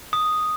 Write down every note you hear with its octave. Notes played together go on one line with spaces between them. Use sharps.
D#6